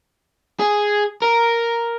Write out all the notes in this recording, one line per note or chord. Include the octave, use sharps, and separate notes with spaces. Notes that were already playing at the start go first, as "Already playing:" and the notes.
G#4
A#4